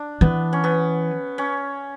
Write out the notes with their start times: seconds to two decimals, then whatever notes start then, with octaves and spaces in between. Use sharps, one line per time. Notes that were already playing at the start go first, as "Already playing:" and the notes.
Already playing: D4
0.21 E3 B3
0.53 C#4
0.64 B3
1.38 C#4